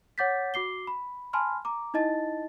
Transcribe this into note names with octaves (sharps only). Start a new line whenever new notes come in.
C#5 F#5 D6 G6 A6 B6
F#4 D6 C7 G7
B5
G#5 A5 B5 C6 F6
A#5 D6
D#4 E4 D#5 A5 A6